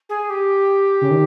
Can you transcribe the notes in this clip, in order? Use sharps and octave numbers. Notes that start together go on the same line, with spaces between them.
G#4
G4
C#3
D#3